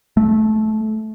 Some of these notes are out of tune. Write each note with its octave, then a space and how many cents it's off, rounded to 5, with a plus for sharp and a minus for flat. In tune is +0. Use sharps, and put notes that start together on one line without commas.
A3 -20